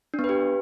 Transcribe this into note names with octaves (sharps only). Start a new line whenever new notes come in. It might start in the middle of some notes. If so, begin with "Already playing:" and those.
D4
B3
B4
G4